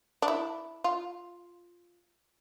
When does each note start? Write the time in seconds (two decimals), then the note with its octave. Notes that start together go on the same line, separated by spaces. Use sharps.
0.22 D4
0.28 E4
0.84 F4